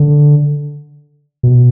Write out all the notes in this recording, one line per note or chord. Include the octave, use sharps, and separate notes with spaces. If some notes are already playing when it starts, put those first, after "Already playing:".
Already playing: D3
B2